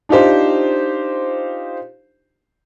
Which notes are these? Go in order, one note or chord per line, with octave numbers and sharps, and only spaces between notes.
D4 D#4 F4 G4 C5